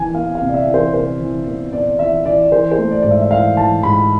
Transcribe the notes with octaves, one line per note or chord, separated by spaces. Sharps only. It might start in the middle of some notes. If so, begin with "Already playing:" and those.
Already playing: E3 B3 G#5
B3 F5
F5
C3
D5
E5
E3
C5
C3 C5
E3
B3
B3 D5
E3 E5
E3 D5
E3 C5
C5
A3
D5
G#2 D5
E5
E5
E3 F5
E3 A5
G#2 B5